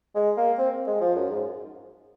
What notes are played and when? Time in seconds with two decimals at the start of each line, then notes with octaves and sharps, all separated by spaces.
0.15 G#3
0.37 A#3
0.58 C4
0.87 G#3
1.01 F3
1.15 F#2
1.30 G#2